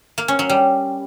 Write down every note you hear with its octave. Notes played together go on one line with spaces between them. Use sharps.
A#3
C#4
F#3
G3